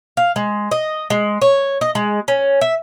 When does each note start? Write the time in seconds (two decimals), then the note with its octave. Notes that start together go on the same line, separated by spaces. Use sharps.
0.17 F5
0.36 G#3
0.71 D#5
1.10 G#3
1.42 C#5
1.81 D#5
1.95 G#3
2.28 C#4
2.61 E5